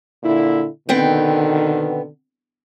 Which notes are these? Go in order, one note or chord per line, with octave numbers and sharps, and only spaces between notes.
A#2 D3 E4
B2 D3 D#3 B3 C4 G5